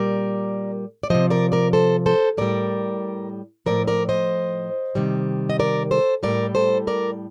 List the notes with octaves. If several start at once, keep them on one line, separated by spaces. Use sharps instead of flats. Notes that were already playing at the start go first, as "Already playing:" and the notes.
Already playing: A#2 G3 A#4 D5
D5
C3 F3 C5 D#5
A#4 D5
A#4 D5
A4 C5
A4 C5
A2 G3 A#4 D5
A2 F3 A#4 D5
A#4 D5
C5 D#5
C3 D#3 G3
D#5
A#4 D5
A4 C5
A2 G3 A#4 D5
A4 C5
A#4 D5